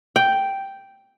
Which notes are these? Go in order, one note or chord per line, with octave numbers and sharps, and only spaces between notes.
G5